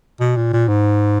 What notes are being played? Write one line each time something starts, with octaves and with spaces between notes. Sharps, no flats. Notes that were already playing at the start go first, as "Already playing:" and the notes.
B2
A#2
A#2
G#2